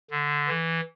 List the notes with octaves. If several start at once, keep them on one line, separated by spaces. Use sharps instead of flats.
D3
E3